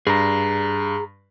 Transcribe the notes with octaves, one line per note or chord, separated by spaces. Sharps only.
G2 G#4 A#5